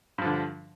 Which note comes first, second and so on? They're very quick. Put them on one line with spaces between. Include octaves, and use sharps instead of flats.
G2 F3 D3